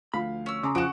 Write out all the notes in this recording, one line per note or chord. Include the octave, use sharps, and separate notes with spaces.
D2 F3 F5 B5
C#4 E6
C#3 A#5 C6 D6
F3 F#4 F#5 D7 E7